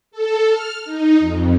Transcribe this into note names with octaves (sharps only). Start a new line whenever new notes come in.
A4
F6
D#4
F2